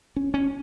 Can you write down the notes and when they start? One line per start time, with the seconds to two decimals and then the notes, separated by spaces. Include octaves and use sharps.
0.16 C#4
0.34 C#4